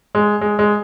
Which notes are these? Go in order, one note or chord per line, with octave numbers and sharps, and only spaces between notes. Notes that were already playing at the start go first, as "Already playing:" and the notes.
G#3
G#3
G#3